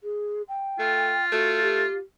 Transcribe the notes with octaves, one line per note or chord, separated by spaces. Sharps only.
G#4
G5
A3 F4
A3 F#4
G4